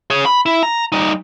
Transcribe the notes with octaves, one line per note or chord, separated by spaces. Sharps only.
G#4 C#5
B5
E4
A#5
G3 D#4